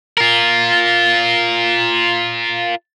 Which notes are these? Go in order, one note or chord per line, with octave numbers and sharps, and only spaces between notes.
F4 A#4